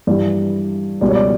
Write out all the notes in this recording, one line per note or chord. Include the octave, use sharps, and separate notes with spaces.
G2 E3 G3 D5
C#2 B2 G3 D5
C#5
D5